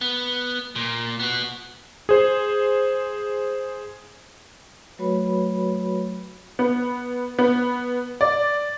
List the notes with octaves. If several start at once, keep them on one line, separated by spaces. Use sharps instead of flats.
B3
A#2
B3 F#4
G#4 C5
F#3 A3 F#4 B4 C#5 B5
B3
B3
D5